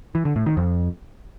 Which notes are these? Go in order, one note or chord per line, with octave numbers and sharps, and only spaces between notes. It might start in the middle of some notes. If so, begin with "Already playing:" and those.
E3
D3
A2
D#3
F2